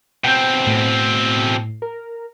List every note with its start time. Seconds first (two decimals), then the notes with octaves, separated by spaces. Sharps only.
0.24 B2 C4 G5
0.67 A2
1.82 A#4